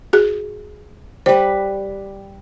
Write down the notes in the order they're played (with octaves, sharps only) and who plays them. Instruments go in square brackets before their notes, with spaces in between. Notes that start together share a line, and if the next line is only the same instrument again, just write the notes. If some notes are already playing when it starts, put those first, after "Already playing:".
[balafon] F#4 G#4
[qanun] G3 B4 [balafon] C5